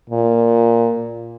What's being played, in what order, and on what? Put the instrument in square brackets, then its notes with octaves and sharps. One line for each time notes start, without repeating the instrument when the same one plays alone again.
[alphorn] A#2